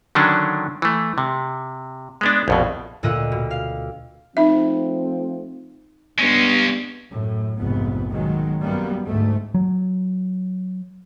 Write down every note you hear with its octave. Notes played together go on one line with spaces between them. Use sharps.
D3 D#3 F#3 C#4 D4
E3 A3
C3
G#3 B3 D4
A#1 F2 B2
D2 A#2 D#5 E6 F#6 D#7
B2
F5
F3 A3 C4 D#4 E5
G2 G#3 B3 C#4
F#2 A2
F1 A#1 F2 G#2 B3
B2 D#3 F#3 G#3
F#2 G3 A#3 B3
D2 G#2 A3
F#3